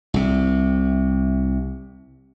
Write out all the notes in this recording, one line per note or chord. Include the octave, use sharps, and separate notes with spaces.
C2 C3